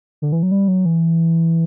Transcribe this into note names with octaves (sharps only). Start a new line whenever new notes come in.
D3
E3
F#3
G3
F#3
E3